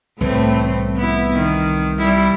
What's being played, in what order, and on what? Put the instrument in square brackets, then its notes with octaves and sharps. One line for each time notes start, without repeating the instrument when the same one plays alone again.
[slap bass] C2 E3 [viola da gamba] A2 A3 C4
[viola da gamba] B3 E4
D#3
G3 E4